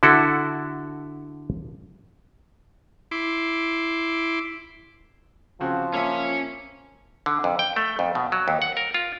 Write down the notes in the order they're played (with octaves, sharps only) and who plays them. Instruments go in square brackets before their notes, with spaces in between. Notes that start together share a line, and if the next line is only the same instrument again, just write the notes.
[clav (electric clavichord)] D3 E4 F#4 A4
[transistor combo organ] E4 C6 D6
[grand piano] C#3 C4 F#4 [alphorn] F3
[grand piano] A#3 E5 [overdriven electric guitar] C#4 C#5
[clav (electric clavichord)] D3
F2
G5
A3
F2
B2
F#3
D#2
F#5
A#4
F4